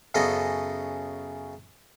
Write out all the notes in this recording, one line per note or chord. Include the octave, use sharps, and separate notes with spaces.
F#2 C#3 B3 A4 D#5